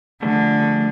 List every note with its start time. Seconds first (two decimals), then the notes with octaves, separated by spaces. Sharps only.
0.22 D3 F3 G3 A3